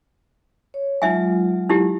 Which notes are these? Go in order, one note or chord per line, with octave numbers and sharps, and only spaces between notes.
C#5
F#3 G#3 D#4 F4 E5 G#5
D#4 E4 G4